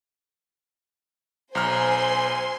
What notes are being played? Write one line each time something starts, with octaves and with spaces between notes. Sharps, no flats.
B1 C5 G#5 A#5 C6 F6